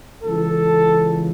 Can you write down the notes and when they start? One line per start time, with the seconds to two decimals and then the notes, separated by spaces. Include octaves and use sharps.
0.24 C#2 C#3 E3 A4